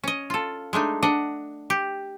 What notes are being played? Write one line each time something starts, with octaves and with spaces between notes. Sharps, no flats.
C#4 D#5
F4 A4
G#3 A3 D4 D#4
D4 D#5 F#5
G4